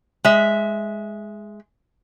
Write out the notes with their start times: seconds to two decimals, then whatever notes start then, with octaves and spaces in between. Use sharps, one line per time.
0.25 G#3 E5